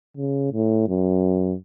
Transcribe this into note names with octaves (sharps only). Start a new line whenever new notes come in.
C#3
A2
F#2